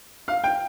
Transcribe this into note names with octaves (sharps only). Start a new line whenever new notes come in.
F5
G5